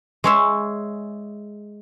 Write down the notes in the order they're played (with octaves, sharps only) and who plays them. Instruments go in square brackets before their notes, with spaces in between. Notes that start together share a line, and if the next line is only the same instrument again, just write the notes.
[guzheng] G#3 C#5 E5